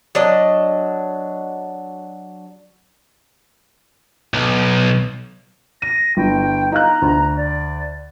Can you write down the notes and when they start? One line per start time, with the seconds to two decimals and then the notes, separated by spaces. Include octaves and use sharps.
0.15 F#3 D4 D#5
4.34 B1
5.82 A#6 D#7
6.17 G1 E4 G5
6.72 D#4 F5 A#5 F#6
7.02 D2
7.37 D5